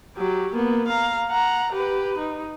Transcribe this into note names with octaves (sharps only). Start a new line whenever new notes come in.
F#3 G4
A#3 B3
F5 A#5
F#5 A#5
G4 B4
D#4